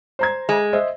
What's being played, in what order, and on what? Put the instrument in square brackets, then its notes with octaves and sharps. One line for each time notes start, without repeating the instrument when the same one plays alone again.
[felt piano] C5 A#5 G#6
[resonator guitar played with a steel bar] G#3
[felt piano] C5 D#5 E5